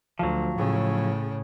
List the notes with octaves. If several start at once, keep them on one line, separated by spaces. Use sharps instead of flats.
D2 F3 F#3
A2 C#3